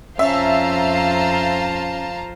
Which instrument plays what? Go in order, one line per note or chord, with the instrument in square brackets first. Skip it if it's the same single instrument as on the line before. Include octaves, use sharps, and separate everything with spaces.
[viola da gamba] F2 F4 C5 [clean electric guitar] C#4 [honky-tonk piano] E5 [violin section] F5 A5 A#5